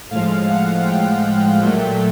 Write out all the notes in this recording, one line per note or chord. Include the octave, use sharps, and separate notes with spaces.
A2 F3 G#3 F5
F#5
G5
A#2 F#3 A3